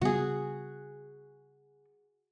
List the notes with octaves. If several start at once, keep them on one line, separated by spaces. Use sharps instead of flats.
C#3 G3 B3 F#4 G#4